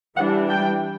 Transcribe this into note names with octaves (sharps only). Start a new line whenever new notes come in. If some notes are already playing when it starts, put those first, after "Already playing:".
E3 G3 D4 F#5
G5